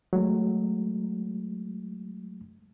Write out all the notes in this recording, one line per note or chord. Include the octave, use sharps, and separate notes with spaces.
F#3 G#3 A3